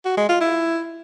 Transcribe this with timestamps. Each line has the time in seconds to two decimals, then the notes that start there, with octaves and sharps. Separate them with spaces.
0.05 F#4
0.17 G#3
0.29 F4
0.41 E4